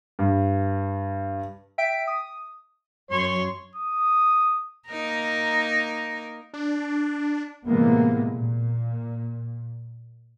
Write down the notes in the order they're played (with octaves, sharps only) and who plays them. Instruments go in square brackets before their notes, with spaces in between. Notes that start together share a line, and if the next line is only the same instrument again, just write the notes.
[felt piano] G2
[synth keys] E5 G5 B6 D7
D#6
[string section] F#2 C6 [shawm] C#5
[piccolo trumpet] D#6
[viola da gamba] A#3 D#4 A#4
[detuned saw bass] D4
[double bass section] A2 C3 E3 G#3 A#3 B3
A#2